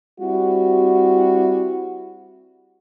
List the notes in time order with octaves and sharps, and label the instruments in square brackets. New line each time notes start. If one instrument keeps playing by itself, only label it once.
[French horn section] G3 C4 E4 F#4